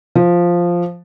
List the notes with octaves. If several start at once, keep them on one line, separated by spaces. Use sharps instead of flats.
F3